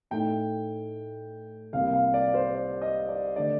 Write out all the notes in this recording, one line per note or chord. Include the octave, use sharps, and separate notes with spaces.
A2 A3 D#4 G5
C2 C3 G3 A#3 F5
F5
D5
C5
D5
D#5
D5
D3 A3 D4 D5